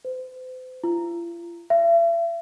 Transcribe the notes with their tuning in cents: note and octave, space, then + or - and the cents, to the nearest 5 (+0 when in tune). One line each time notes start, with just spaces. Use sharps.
C5 -40
F4 -45
E5 +40